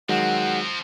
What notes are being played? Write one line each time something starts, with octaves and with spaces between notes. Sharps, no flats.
D#3 F3 F#3 G#3 C4 F#5